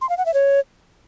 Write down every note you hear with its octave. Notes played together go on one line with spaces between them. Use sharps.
C6
F5
F#5
E5
C#5